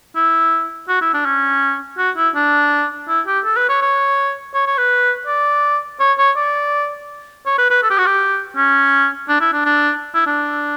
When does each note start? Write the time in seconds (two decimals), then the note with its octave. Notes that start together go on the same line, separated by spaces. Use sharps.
0.15 E4
0.88 F#4
1.02 E4
1.14 D4
1.26 C#4
1.98 F#4
2.17 E4
2.35 D4
3.08 E4
3.27 G4
3.44 A4
3.56 B4
3.69 C#5
3.81 C#5
4.54 C#5
4.66 C#5
4.78 B4
5.27 D5
6.00 C#5
6.18 C#5
6.37 D5
7.46 C#5
7.58 B4
7.70 B4
7.83 A4
7.90 G4
7.98 F#4
8.06 G4
8.56 C#4
9.29 D4
9.41 E4
9.53 D4
9.65 D4
10.14 E4
10.26 D4